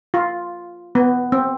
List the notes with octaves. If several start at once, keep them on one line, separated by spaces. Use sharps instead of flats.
F4
B3
C4